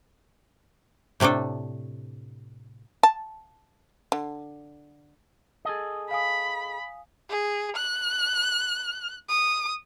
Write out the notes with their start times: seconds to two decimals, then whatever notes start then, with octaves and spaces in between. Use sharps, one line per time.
1.20 A2 C3 A3 D4 A4
3.03 A5
4.12 D3
5.65 G#4 A4 D#5
6.11 F5 G#5 B5 D#6
7.30 G#4
7.76 F#6
9.29 D#6